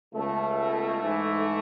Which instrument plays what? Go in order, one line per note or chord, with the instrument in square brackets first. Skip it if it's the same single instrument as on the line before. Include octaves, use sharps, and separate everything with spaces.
[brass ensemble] C#2 B2 A3
G#2 E3